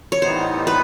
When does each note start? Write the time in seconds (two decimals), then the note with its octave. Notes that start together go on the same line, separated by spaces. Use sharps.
0.12 C#5
0.21 A2 E3 G3 B3 D#4 C5
0.67 B4